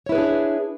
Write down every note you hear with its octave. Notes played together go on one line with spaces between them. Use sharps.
D4 E4 G#4 B4 C#5